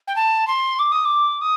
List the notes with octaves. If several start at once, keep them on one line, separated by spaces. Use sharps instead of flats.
G5
A5
C6
D6
D#6
D6
D#6